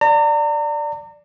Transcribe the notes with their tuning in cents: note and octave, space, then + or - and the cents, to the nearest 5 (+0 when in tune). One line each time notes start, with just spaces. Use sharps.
D5 +0 A#5 -40